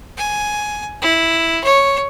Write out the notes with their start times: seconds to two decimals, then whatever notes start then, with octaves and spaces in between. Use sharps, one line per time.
0.18 G#5
1.02 E4
1.64 C#5